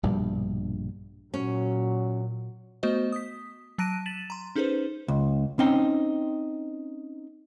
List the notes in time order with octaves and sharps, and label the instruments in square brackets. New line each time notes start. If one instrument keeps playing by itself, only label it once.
[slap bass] A#1 G2 B2 G3
[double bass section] A#2 [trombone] F#3 [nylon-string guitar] C#4
[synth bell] A3 B3 F#4 C5 D#5
D#6 B6
F#3 A5 F#6 A#6 D7 D#7
A6 B6 D#7 E7 F#7
A#5 C6
C#4 D#4 G#4 A4 B4 C5
[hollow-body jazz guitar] C#2
C4 C#4 D#4 G5